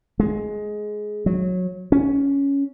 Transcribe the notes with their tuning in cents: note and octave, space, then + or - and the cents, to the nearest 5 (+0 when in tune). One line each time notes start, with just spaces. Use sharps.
G#3 +15
F#3 -20
C#4 +5